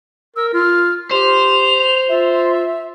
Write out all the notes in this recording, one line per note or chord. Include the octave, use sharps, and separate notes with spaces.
A#4 E6
F4 F6
G4 C5 F7
F4 E5